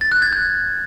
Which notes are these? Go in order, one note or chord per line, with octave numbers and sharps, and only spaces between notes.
A6
F#6
G#6
G6